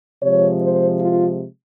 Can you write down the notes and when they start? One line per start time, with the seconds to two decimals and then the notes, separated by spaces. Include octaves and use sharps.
0.22 C3 F3 G#3 C#5
0.61 C5
0.99 F4